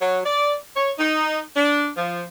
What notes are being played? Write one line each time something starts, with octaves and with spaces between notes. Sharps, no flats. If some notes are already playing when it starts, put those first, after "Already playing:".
F#3
D5
C#5
D#4
D4
F3